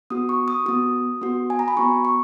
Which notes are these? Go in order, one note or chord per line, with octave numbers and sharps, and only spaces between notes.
B3 F#4 D#6
C#6
D#6
B3 F#4 D#6
B3 F#4
G#5
A#5
B5
B3 F#4 C#6
C#6